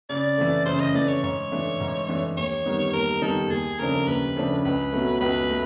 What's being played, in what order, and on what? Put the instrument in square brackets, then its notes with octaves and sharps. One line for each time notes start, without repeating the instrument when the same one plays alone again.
[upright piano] C#3 [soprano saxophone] D5
[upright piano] E3 A3
[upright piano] C#3 [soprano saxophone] C5
[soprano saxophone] D#5
[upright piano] E3 A3 [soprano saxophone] D5
[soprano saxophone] C#5
[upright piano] G#2 [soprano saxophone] C#5
[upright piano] E3 A3 D4
G#2
E3 A3 D4
[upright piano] D#2 [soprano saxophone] C#5
[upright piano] D#3 G3 B3 D#4
[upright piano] D#2 [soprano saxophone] A#4
[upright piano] D#3 G3 B3 D#4 [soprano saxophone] A4
[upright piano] D#2 [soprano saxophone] G#4
[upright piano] C#3 F3 A3 D4 [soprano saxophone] A#4
[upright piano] D#2 [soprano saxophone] B4
[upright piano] C#3 F3 A3 D4
[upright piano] C#2 [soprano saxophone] B4
[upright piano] B2 F#3 A3
[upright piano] C#2 [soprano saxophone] B4
[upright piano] A3